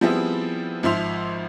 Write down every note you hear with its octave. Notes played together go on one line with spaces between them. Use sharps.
F3 G3 B3 C4 E4 G#4
G#1 F3 E5 C6 F7